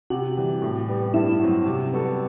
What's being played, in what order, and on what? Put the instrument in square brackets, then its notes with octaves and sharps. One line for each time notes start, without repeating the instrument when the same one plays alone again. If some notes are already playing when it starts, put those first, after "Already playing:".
[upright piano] C3 [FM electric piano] F#4
[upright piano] E3 G3
A2
G3 B3
[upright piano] G2 [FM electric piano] E4
[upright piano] F#3 C4 F#4
C3
G3 B3 F#4 A4